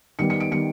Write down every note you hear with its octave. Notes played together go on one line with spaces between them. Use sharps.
D#3 G3 B3 C#7
C#7
D7
D#3 G3 B3 C#7